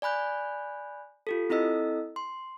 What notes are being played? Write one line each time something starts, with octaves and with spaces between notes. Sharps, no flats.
D5 G#5 B5 F#6 G6
F4 G4 A4
C4 E4 A4 D#5 E6
C6